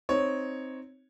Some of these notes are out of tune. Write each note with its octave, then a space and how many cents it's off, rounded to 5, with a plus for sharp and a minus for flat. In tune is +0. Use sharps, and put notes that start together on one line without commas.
C4 +0 D#4 +0 C#5 +0